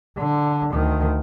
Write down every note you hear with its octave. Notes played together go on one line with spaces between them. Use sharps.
D3
D2 D#3